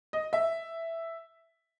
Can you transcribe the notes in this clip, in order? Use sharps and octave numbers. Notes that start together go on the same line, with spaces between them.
D#5
E5